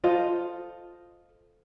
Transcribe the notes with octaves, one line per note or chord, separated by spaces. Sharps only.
F4 A4 C5 D#5